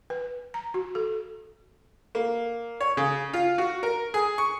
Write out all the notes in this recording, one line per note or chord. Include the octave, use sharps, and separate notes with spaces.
B4
A#5
F#4
A4
A#3
C#5
C#3
F4
F#4
A#4
G#4
C#6